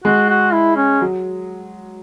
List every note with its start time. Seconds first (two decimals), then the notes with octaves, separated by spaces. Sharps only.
0.04 G#3 F#4
0.29 F#4
0.53 E4
0.76 C#4
1.01 F#3